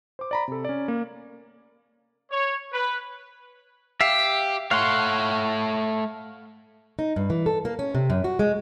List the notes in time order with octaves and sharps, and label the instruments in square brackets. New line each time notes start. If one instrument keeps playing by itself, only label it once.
[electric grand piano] C5 D6
D5 A#5 B5
C3 A4
C#4 D5
A#3
[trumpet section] C#5
B4
[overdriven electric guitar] G4 [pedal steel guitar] E5 F5
[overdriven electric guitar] A3 C#5 [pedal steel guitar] F5 F#5 C6
[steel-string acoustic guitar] D#4
G2
E3
A4
A#3
C#4
C3
F#2
F#4
G#3